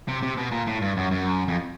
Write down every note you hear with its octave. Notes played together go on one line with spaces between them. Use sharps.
C3
C3
B2
A#2
A2
G2
F#2
F#2
F2